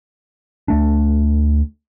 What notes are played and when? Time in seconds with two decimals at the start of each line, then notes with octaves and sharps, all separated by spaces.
0.68 D2 A3 D4